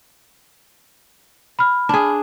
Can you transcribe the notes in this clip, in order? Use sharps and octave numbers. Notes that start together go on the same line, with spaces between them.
B5 F6
D4 G#4